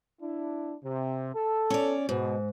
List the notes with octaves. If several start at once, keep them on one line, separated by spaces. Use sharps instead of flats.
D4 E4
C3
A4
C#4 D5
G#2 B2